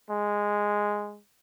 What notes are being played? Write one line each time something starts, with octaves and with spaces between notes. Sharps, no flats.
G#3